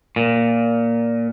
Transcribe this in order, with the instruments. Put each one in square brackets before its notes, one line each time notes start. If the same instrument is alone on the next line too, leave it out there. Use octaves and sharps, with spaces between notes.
[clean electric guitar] A#2